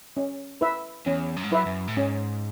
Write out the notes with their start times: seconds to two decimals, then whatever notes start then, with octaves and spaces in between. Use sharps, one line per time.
0.17 C#4
0.61 E4 B4 E5
1.06 E2 C#4
1.36 F#2
1.43 G#2
1.51 F#2 E4 B4 E5
1.66 F#2
1.88 A2
1.96 G#2 C#4